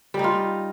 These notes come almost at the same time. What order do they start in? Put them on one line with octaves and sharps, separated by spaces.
G3 D#4 F4